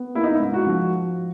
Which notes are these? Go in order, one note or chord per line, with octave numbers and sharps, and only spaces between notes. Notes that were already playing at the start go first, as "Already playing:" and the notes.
Already playing: B3
A#3 E4
D#4
E4
G#2
F#4
F3